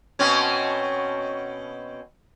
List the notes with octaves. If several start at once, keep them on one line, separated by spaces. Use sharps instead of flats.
B2 C4 C#4